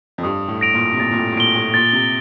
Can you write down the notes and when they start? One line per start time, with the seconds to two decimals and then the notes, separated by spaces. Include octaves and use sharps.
0.18 F2
0.23 G2 D#6
0.48 A2
0.61 A#6 D7 F7
0.74 A#2
0.94 C3
0.99 A#2 A6
1.11 A#2
1.18 A2
1.32 A2
1.37 A#2 D7 G7
1.55 A2
1.74 A#2 A6
1.93 C3